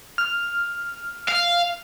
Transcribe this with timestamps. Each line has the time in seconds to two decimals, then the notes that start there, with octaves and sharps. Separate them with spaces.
0.18 F6
1.28 F5